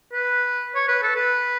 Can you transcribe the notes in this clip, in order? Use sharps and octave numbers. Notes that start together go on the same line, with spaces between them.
B4
C#5
B4
A4
B4